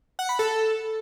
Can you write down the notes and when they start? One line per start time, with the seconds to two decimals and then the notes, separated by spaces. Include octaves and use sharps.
0.19 F#5
0.29 B5
0.39 A4